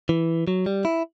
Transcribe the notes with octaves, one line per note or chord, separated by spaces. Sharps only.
E3
F#3
G3
E4